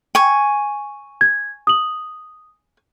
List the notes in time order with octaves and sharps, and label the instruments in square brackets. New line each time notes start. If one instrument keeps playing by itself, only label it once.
[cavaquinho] G#5 C#6
[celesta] G#6
D#6 F#7